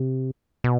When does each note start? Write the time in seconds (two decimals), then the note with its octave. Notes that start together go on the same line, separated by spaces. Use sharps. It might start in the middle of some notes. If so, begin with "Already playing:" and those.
Already playing: C3
0.64 B2